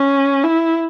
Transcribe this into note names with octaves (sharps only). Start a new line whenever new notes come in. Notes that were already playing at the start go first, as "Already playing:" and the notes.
Already playing: C#4
E4